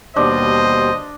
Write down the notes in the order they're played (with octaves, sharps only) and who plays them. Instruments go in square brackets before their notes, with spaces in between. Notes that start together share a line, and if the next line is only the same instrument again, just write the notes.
[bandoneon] D#2 B2 G3 [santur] D4 [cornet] C5 [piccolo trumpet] D#5